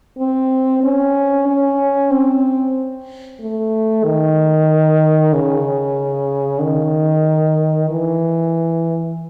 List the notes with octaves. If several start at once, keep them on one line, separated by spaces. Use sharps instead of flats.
C4
C#4
C#4
C4
A3
D#3
C#3
D#3
E3